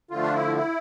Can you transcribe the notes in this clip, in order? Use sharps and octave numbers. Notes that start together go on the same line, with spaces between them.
D3 F3 A3 F4
D4
E4
E4